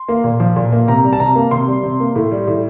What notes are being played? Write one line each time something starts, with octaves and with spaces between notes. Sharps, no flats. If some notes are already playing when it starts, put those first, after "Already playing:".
Already playing: C6
A#3
A#2
F3
A#2
A#3
C3 A#5
G3
A5
C3 A#5
A#3
C3 C6
G3
C3
A#3
A2
G3
A2